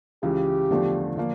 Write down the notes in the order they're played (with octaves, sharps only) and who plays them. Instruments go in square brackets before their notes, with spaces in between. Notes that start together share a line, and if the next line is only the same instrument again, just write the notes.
[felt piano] C#2 C#3 E3 [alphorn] G4
[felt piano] E2 D3 F3 A3
D3 F3 A#3